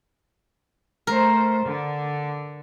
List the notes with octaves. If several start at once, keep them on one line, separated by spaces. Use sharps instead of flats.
A3 A#4 C5
D3